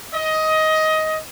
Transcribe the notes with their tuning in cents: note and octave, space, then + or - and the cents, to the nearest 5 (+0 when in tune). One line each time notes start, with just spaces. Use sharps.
D#5 +15